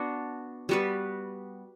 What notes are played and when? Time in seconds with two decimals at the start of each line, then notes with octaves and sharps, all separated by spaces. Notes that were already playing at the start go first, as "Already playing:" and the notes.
Already playing: B3 D4 F#4
0.69 G3 B3 F#4 B4